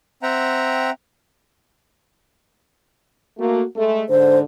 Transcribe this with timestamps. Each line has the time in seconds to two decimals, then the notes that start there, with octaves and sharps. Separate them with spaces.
0.23 C4 E5 F#5 G5 A#5
3.38 A3 A#3 F#4
3.76 G#3 A3
4.09 G#2 D3 C5